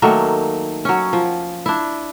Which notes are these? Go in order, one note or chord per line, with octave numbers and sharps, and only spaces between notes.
D#3 F#3 A3 A#3
F#3 C#4
F3
D4 E4